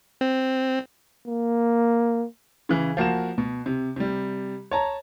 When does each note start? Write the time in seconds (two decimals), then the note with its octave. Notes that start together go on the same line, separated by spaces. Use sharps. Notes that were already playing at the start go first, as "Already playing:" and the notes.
0.21 C4
1.27 A#3
2.69 C#3 E3
2.97 F3 A#3 F#4 E7
3.38 B2
3.66 C3
3.96 C3 G3
4.71 C#5 A5 A#5